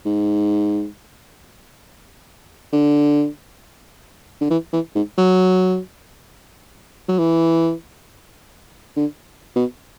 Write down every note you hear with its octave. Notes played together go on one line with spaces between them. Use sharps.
G#2
D3
D3
E3
E3
G#2
F#3
F#3
E3
D3
B2